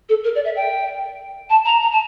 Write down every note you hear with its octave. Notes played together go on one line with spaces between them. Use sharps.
A4
A#4
D5
E5
G5
A5
A#5
A#5
A5